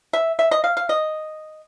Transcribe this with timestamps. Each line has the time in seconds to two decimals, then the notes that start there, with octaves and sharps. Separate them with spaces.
0.13 E5
0.39 E5
0.51 D#5
0.64 F5
0.77 F5
0.89 D#5